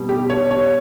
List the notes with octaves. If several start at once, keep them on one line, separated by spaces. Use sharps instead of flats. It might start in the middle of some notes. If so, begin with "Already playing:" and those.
Already playing: B2 G3
G4
C#5
C#5